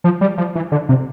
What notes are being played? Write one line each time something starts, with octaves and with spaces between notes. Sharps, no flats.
F3
G3
F3
E3
D3
C3